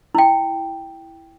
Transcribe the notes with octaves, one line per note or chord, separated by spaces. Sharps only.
E4 G5